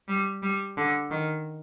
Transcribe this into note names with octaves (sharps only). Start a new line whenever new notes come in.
G3
G3
D3
D#3